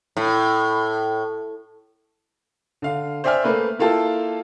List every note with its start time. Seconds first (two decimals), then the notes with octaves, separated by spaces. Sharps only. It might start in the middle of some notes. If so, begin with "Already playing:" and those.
0.17 A2
2.82 D3 F5
3.24 C5 D5 E5 G5 G#5 F6
3.44 A3 A#3 B4 C5
3.79 A#3 E4 F4 A4 G5 A5